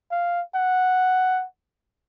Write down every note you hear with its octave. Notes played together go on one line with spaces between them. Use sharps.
F5
F#5